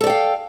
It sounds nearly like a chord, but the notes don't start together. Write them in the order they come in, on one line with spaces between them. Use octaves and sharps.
A4 D5 G5 F5